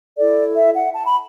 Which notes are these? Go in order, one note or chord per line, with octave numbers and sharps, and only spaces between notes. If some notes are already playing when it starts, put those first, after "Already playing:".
E4 A4 D5
E5
F#5
A5
B5